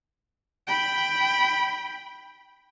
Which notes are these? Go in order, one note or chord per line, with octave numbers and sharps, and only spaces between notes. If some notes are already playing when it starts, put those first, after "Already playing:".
G5 B5